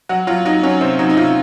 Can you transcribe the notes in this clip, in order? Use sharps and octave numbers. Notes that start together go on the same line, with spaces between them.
F#3 F#4
F#3 F4
F#3 D#4
F#3 C#4
C3 C4
F#3 D#4
D#4
C3 F4